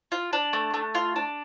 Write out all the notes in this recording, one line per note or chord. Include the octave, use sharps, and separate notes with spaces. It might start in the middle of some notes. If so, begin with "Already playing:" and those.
F4
D4
A3
A3
F4
D4